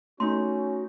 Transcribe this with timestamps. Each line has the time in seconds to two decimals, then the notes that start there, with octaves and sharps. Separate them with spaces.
0.20 A3 C#4 D#4 F#4 C6